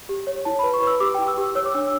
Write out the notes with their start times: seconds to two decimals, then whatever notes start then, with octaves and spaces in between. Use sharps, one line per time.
0.09 G4
0.27 C#5
0.45 E4 A5
0.59 B5
0.63 B4
0.74 C#6
0.82 B4 E6
1.00 G4 D6
1.14 G5
1.18 E4
1.28 E6
1.38 G4
1.55 C#5 E6
1.66 D6
1.74 D4 E6